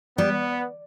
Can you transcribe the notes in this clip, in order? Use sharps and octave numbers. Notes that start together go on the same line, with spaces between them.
G3 B3